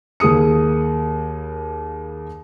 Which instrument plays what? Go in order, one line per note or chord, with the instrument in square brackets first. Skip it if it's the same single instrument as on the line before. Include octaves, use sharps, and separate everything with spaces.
[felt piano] D#2 A#3 G#4 D#6 C#7